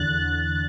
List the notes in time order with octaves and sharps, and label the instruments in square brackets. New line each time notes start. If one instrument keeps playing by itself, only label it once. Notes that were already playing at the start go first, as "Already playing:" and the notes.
Already playing: [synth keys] E2 D3 F#6 A6